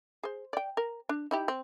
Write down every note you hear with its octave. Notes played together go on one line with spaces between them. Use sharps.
G#4 C5
D5 G5
A#4
D4
D#4 E4 G4
C4